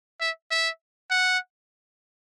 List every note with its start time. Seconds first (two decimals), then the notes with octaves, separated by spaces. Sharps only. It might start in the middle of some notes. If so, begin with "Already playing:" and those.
0.21 E5
0.51 E5
1.11 F#5